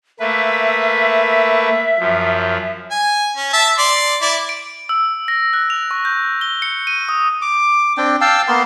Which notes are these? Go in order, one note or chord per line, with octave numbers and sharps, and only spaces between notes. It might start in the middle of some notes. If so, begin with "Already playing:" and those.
A3 A#3 B4 E5
F#2 F3
G#5
C#4
E5 A5
D5 C6
E4 D5
D7
E6
A#6
F#6
F7
C#6
G6
G7
C#7
D#7
D#6
D6
C4 D4 G5
F5 G5 A5 E6
A#3 B3 C6